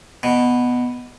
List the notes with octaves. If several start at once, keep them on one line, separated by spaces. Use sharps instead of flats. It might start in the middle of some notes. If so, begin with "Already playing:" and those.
B2